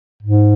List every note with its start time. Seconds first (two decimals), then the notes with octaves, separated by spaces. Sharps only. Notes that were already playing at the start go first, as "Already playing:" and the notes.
0.23 G#2